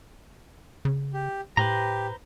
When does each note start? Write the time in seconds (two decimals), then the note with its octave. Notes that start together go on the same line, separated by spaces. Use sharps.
0.85 C#3
1.13 G4
1.57 A2 G4 B4 C5 A#5